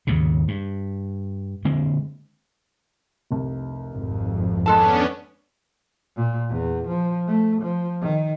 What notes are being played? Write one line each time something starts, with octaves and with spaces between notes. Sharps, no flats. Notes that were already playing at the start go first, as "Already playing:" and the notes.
D#2 G#2 C#3
G2
D3 G#3 A#3 C4
F1 C2
G#1 F2
G#3 B3 C#4 D4 A4 A#4 A5
A#2
E2
F3
A3
F3
D#3